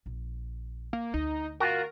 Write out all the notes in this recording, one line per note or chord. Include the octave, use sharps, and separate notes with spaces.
A#1
A#3
D2 D#4
F4 F#4 A#4